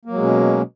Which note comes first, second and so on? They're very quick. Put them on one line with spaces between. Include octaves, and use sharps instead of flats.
A#3 F#3 G#3 B2 C#4